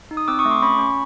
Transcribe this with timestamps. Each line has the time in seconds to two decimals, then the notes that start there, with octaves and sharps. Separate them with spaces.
0.11 D#4
0.17 D#6
0.28 C4 D6 E6
0.39 C#6 D#6
0.45 A3
0.51 C6 D6
0.62 C#4 B5 C#6
0.79 C#4